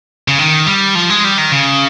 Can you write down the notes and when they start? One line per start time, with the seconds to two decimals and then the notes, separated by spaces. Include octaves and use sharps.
0.28 C#3
0.38 D#3
0.66 G3
0.95 F3
1.10 G#3
1.24 G3
1.38 D#3
1.52 C#3